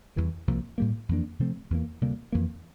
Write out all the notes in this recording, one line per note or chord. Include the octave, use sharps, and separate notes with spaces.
E2 E3 G3
C2 C3 F3 A#3
A2 G3 A#3
F2 E3 A#3 D4
C3 F3 A3 C4
E2 E3 A#3
D2 C3 G3 A#3
F2 E3 A#3